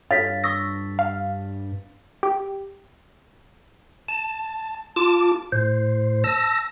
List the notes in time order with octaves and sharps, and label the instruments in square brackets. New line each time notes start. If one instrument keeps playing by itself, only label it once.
[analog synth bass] G2 [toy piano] F4 A4 C#5 [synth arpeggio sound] F5 [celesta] A6 B6
[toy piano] C#6 D#6 E6 [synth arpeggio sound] A#6
[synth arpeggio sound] F5
G4
[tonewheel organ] A5
F4 A5 D6
A2 C5
A5 E6 A#6